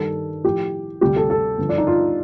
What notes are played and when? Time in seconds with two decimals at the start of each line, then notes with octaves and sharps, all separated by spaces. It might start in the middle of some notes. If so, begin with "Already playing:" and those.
Already playing: G2 D#3 G3 A4
0.44 A2 F3 G4
1.01 D2 C3 G3 G4
1.16 A4
1.30 A4
1.58 G2 D3 F3
1.69 D4
1.78 D#4
1.87 F4